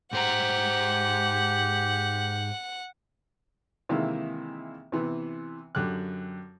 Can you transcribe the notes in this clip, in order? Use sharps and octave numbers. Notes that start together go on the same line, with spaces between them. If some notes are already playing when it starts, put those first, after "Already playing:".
G#2 G4 C5 F#5 A#5
C3 D#3 E3 G#3 A#3 E4
C3 E3 B3
F#2 D3 G4 D6 F#6